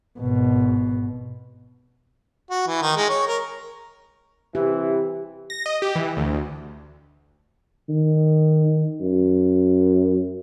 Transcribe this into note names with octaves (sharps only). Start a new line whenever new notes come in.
G#1 B2
F#4
E3
D#3
G#3
C#5
A#4
C3 E3 G4
A#6
D#5
G4
E3
D2
D#3
F#2